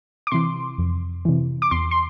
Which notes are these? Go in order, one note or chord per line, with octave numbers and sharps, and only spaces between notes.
D6
C3 E3 C6
F2
C3 E3
D6
E2 C6
C6